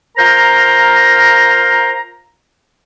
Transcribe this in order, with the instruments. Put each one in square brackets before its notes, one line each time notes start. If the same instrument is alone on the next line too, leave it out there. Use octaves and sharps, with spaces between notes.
[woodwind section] F4 A#4 C5 A#5